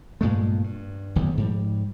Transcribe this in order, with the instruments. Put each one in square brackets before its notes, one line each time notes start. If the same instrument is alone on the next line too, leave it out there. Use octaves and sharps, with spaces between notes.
[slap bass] G2 A#2 G#3 A3
G2
D1 B1 F#2 D#3
G#2 F3 G3